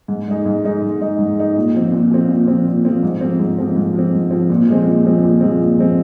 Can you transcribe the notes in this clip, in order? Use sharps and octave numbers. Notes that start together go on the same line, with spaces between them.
G#2
G#3 D#4
G#2
G#3 D#4
G#2
G#3 D#4
G#2
G#3 D#4
A#2
F3 C4
A#2
F3 C4
A#2
F3 C4
A#2
F3 C4
G#2
F3 C4
G#2
F3 C4
G#2
F3 C4
G#2
F3 C4
A#2
F3 G#3 C4
A#2
F3 G#3 C4
A#2
F3 G#3 C4
A#2
F3 G#3 C4